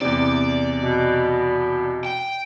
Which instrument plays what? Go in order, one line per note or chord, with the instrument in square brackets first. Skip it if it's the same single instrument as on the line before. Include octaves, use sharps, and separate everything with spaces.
[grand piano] E2 C3 [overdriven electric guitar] D5
[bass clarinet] B2
[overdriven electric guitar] G5